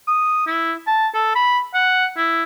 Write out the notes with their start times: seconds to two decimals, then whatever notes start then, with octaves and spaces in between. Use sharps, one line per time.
0.07 D#6
0.47 E4
0.87 A5
1.14 A4
1.35 B5
1.74 F#5
2.17 E4